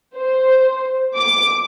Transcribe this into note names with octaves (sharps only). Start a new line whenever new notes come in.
C5
D6